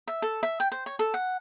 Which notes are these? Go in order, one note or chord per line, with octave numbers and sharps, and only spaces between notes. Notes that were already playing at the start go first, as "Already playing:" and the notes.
E5
A4
E5
G5
C5
C#5
A4
F#5